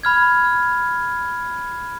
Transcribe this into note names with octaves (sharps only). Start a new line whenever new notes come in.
B5 F6 G#6